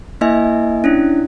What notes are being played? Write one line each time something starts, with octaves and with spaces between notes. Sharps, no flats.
A#3 E4 D#5 E5 G#5
C#4 D4 E4